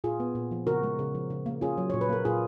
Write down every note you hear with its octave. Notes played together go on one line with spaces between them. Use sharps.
A#2 F4 G#4
B3
A#2
F3
C#3 F#4 A#4
G#3
C#3
F3
C#3
A#3
C#4 F4 G#4
F#3
A#2 C#5
B4
A#3 A#4
A#2 F4 G#4